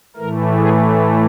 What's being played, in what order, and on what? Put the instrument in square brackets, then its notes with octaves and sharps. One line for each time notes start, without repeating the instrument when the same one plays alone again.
[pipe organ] A2 E3 A3 A#4
G#4